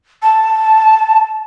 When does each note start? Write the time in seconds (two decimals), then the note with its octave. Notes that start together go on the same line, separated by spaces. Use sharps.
0.23 A5